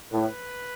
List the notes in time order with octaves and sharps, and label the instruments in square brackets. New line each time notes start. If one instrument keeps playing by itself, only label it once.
[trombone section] A2 [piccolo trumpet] B4